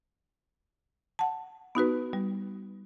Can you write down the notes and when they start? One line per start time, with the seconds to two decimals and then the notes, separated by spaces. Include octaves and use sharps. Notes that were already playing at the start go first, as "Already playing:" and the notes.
1.19 F#5 A5
1.75 B3 D#4 F#4 B4
2.13 G3